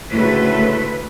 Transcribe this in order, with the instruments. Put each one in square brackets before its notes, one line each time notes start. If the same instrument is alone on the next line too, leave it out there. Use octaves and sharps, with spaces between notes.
[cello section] D2 A3 B4 [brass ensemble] A2 C#3